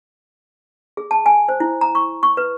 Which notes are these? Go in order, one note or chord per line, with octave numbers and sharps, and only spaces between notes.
G#4
A5
G#5
C5
E4
A#5
C#6
C#6
B4